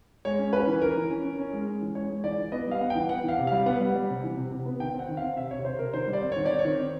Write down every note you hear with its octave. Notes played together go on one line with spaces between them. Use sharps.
G#3 C#5
C#4
C#4 B4
E3
E3 A#4
E3
C#4
C#4
C#4
G#3
C#4
E3
G#3 C#5
G#3
E3 D5
E3
B3 D#5
G3 F5
B3 F#5
E3 G5
B3 F#5
E3 F5
C3
G3 F5
B3 F#5
G3
G3
C3
E3
C3
C3
B3
D#3 G5
C4
F#5
D#3
F5
C4
C3 E5
C3 C#5
C3 C5
C3 A#4
D#3 C5
G3
D5
C4
D#3 C#5
D5
C4
C#5
D#3
C4